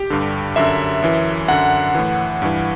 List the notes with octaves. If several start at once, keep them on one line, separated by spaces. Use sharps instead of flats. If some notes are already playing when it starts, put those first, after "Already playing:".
Already playing: G4
G2 D3
F#2 D3 E5
F#2 E3
F#2 D3 F#5
A2 E3
G2 E3